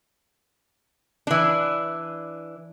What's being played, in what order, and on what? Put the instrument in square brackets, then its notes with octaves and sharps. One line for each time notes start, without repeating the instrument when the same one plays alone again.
[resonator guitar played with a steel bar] E3 D4